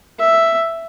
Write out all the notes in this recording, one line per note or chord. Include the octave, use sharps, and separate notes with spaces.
E5